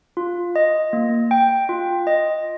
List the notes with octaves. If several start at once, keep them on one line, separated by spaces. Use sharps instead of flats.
F4
D#5
A#3
G5
F4
D#5